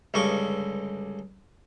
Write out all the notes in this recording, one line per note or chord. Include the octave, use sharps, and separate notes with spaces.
C#2 G2 D3 D#5 C#6 D6